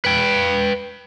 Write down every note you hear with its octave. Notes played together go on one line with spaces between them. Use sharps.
B4 G5